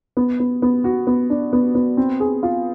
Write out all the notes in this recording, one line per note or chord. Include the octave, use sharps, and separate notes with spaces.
B3
B3
B3
F#4
B3
D4
B3
B3
C4
G#4
F4